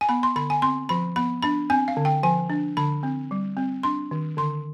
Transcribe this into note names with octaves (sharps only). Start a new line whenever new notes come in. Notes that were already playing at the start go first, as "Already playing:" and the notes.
G#5
B3 B5
C6
D3 B5
G#5
C4 C6
F3 B5
B3 B5
D4 B5
C4 G#5
F5
D3
G5
F3 G#5
D4
D3 B5
C4
G3
C4
D4 C6
D#3
D3 C6